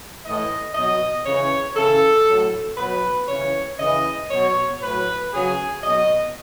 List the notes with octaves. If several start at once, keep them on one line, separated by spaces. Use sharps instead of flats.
A2 E3 D#5
B2 F#3 D#5
C#3 E3 C#5
C#3 E3 A4
A2 F#3
B2 F#3 B4
C#3 E3 C#5
C#3 E3 D#5
B2 F#3 C#5
A2 F#3 B4
C#3 F#3 G#4
B2 F#3 D#5